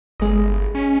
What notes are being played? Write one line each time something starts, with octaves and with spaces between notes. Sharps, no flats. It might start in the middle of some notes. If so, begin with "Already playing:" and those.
G1 G#3 D#5
C#4